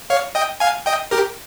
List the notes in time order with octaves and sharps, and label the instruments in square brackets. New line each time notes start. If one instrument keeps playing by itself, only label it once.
[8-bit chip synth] C#5 F5
D#5 G5
F5 G#5
D#5 G5
G4 A#4